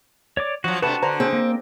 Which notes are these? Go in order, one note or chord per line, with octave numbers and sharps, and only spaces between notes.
C#5 D5 D6
F3 F#3 F#4
C3 A3 D4 F#4 B4 A5
D3 B4 C5 A#5
C4 G#4
A#3